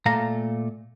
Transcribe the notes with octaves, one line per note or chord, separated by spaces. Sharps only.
A#2 A3 F5 A#5